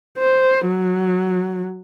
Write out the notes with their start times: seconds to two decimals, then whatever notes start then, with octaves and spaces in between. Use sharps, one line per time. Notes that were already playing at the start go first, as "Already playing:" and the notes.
0.18 C5
0.67 F#3